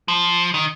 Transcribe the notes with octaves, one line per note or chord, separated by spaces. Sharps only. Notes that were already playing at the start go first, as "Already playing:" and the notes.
F3
D#3